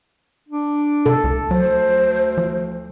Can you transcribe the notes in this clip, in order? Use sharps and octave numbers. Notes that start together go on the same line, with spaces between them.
D4
C3 A4
C#2
D2 F#3 C5
F3